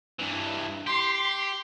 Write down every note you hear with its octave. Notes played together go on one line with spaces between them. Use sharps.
G2 E3
G4 C6